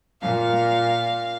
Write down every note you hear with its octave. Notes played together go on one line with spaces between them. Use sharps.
A#2 F5